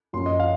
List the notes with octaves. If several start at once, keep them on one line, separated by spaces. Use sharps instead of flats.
F#2 F3 A#3 C#4 C6
D#5
F5